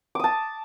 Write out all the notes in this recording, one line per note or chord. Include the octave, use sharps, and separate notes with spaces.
A5 D6 D#6